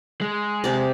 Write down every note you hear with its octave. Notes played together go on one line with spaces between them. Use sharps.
G#3
C3 D5